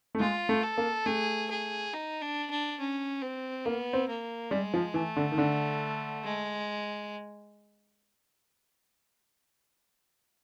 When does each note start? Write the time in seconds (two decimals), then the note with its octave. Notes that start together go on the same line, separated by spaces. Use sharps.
0.15 A3
0.20 G#3 F4
0.49 A3
0.63 A4
0.78 A#3
1.06 A3 G#4
1.50 G#4
1.93 D#4
2.22 D4
2.50 D4
2.80 C#4
3.22 C4
3.65 A#3 B3
3.93 C4
4.08 A#3
4.51 G3 G#3
4.74 F3
4.94 E3 A3
5.16 D3
5.32 D#3
5.38 D3
6.24 G#3